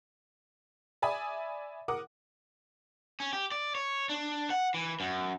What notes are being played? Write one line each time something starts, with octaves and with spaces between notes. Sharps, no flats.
D5 E5 G#5 B5 D#6
A#4 F#5 D6 D#6
C#4
G4
D5
C#5
D4
F#5
E3
F#2